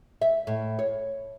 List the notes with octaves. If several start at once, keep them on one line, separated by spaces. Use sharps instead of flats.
E5
A2
C#5